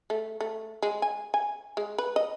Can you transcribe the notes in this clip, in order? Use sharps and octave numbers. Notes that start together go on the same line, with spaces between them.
A3
A3
G#3
G#5
G#5
G#3
B4
D#5